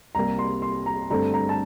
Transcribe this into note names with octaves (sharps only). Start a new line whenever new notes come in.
C2 C3 G3 A#3 A#5
C6
C6
A#5
G2 D3 A3 C4 A#5
A#5
A5